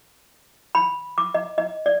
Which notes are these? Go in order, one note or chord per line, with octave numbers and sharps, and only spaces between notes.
B5
D6
D#5
D#5
D5